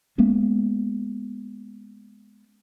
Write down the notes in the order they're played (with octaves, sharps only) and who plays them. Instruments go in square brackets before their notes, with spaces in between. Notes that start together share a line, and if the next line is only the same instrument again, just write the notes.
[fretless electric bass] G#3 A#3 B3 C#4